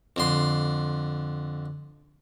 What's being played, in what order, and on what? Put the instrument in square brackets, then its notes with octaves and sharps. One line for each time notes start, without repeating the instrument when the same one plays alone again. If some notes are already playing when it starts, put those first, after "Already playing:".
[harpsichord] F2 D3 C6